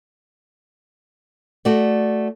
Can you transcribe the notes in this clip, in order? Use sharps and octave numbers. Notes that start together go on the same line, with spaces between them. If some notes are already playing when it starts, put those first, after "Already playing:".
A3 F#4 D5